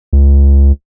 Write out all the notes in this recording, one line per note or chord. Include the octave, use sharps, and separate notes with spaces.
C#2